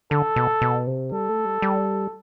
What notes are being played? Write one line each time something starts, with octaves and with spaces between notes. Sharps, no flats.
D3 A4
B2
B2
C3
G3 A4
A3
G3
G3